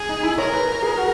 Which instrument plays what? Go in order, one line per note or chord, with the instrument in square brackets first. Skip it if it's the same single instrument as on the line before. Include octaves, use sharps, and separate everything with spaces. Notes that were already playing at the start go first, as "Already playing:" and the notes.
Already playing: [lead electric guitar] G#4
[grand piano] D#4
E4
[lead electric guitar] A#4 [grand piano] C#5
[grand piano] B4
G#4
F#4